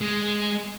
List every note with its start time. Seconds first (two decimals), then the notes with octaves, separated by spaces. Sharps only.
0.01 G#3